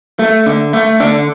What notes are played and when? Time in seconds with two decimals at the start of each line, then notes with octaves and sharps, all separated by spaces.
0.19 A3
0.46 D3
0.73 A3
1.00 D3 D4